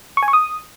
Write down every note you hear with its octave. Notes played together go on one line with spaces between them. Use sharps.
C#6
G#5
C#6
D#6